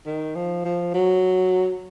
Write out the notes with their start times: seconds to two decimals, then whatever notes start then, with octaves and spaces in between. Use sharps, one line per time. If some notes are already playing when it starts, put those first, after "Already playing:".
0.06 D#3
0.35 F3
0.65 F3
0.94 F#3